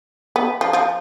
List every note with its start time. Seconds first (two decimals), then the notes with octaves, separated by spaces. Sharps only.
0.36 B3
0.61 F3
0.73 F3